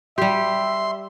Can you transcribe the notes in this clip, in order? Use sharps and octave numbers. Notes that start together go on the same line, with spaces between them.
G3 G4 E5 C6